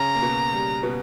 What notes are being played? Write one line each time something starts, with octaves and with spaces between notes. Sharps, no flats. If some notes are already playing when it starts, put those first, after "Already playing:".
Already playing: C#3 C#4 A#5
A#3
B2 B3
G3
B2 B3